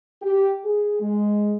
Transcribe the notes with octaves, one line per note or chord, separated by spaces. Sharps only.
G4
G#4
G#3